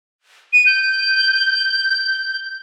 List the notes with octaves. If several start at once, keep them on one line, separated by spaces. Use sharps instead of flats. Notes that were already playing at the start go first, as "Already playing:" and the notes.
D#7
G6